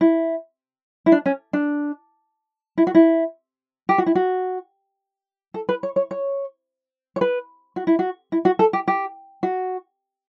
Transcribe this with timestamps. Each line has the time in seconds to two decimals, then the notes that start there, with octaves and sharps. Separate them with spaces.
0.01 E4
1.06 E4
1.12 D4
1.26 C#4
1.53 D4
2.78 E4
2.87 F#4
2.95 E4
3.89 G4
3.98 F#4
4.06 E4
4.15 F#4
5.54 A4
5.69 B4
5.83 C#5
5.96 C#5
6.11 C#5
7.16 C#5
7.21 B4
7.76 F#4
7.87 E4
7.99 F#4
8.32 E4
8.45 F#4
8.59 A4
8.73 G4
8.88 G4
9.43 F#4